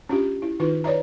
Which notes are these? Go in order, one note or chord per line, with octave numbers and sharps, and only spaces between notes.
C#4 D4 F4 G4
E4
D#3 D#4 F4 B4
B4 C#5 D5 E5 A#5